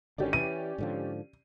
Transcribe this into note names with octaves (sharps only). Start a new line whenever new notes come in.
G#1 D3 D#3 C#4 G4 D5
E3 D#7
G#2 D3 F3